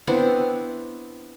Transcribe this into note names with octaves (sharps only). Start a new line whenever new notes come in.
B3 C4 D4 E4